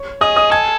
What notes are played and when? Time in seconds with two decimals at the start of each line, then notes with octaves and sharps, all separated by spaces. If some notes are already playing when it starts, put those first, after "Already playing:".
Already playing: C#5 C#6
0.21 G#4 D#5 D#6
0.36 D#5 D#6
0.51 A4 G#5 G#6